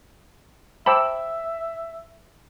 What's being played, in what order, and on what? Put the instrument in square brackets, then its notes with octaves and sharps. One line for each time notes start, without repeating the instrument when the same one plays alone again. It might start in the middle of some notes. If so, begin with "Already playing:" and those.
[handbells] C5 A5 B5 [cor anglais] E5 [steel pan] G5 D6 E6